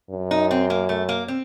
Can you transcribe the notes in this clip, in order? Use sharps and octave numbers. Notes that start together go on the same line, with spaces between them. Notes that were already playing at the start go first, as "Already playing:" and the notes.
F#2
D#4
C4
A#3
A3
A#3
C4